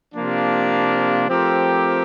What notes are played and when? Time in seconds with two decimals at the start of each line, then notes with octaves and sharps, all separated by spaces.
0.14 C3 F3 A#3 D4 F4
1.27 F3 A3 C4 G4 A#4